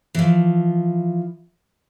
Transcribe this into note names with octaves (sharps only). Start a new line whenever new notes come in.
E3 F3